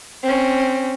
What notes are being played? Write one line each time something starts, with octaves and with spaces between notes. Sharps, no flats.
C4 C#4